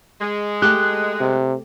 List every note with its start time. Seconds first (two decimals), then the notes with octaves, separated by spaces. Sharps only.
0.21 G#3
0.62 A3 G4 F#6
1.20 C3